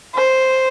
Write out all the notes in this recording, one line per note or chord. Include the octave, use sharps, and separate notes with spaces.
C5